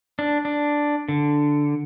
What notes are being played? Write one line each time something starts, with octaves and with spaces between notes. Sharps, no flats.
D4
D4
D3